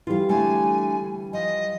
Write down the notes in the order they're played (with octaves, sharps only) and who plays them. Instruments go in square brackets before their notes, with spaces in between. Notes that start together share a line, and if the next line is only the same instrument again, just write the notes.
[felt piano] E3 G3 [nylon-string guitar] F4 F5
[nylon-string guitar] D3 A3 [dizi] G#5
[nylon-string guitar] F3 [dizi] D#5